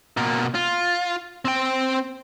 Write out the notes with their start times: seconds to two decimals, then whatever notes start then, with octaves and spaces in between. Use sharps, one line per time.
0.17 B2 A#3
0.55 F4
1.45 C4 G5